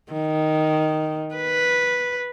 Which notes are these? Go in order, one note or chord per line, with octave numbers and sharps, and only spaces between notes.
D#3
B4